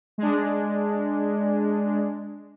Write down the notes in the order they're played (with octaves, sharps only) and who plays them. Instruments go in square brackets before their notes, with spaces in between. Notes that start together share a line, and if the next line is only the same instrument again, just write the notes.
[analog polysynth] G#3 D4